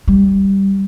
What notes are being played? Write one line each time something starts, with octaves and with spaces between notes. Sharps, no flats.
G3